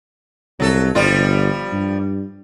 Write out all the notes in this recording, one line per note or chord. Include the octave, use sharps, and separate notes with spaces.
C2 F#3 A4
G1 F3 G3 F4
G2